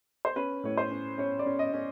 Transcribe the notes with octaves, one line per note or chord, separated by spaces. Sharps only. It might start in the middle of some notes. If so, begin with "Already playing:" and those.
C5
C#4 B4
A2 C#5
C5
C#4
C#4 C#5
D5
C#4
D#5
C#4